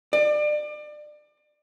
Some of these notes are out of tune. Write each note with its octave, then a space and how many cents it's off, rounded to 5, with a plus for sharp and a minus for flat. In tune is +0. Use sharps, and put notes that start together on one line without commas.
D5 +30